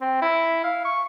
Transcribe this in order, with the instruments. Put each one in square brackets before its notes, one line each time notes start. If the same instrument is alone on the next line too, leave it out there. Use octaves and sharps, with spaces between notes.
[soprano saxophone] C4
E4
F5
C#6